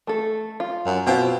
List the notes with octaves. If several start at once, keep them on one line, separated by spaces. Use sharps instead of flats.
A3 A4
F4
F#2
B2 C4 F4